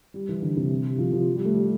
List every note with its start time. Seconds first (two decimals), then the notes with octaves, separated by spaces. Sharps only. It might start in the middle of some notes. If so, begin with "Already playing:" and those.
0.14 G3
0.29 E3
0.42 D3
0.57 C3
0.98 F3
1.12 F3
1.36 G3
1.45 A3
1.54 G3